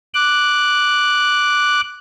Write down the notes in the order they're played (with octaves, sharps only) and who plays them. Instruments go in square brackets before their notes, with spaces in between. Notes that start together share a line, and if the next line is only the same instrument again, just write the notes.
[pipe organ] D6 F#6